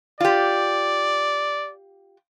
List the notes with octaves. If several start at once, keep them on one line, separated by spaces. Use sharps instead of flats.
F4 G4 D5